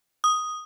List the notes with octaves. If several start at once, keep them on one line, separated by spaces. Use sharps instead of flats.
D#6